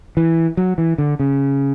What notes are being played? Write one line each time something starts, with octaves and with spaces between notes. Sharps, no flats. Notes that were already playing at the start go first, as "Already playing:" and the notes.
E3
F#3
E3
D3
C#3